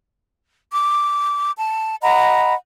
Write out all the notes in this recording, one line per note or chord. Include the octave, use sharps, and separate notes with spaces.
D6
A5
D#5 F#5 A#5 B5